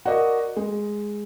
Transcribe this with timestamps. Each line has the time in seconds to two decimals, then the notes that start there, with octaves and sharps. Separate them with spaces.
0.05 F#4 A#4 D5 D#5
0.56 G#3